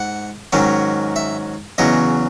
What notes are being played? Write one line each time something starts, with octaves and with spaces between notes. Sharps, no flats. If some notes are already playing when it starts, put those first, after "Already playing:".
Already playing: G#2 F#5
G#2 D#3 F#3 C#4
E5
E2 C#3 F#3 D#5